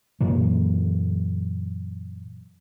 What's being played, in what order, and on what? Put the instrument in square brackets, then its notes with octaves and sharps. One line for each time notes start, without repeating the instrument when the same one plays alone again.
[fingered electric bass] F#2 A#2 E3 F#3